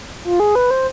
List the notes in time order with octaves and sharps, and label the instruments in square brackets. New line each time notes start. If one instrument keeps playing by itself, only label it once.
[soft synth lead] F4
G#4
B4
C5